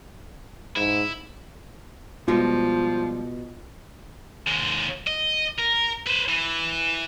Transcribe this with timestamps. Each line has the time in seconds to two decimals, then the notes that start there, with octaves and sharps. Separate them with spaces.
0.76 G#2 E4
2.28 B2 F3 G3 G#3 F4
4.48 D#2 G#3
5.07 D#5
5.59 A#4
6.07 B4 C5
6.29 E3